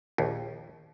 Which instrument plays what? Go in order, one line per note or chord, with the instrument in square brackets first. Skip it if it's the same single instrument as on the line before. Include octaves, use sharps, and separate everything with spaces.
[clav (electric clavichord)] A#1 D#2